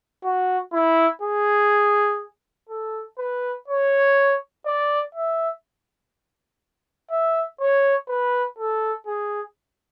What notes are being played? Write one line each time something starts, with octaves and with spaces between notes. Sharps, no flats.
F#4
E4
G#4
A4
B4
C#5
D5
E5
E5
C#5
B4
A4
G#4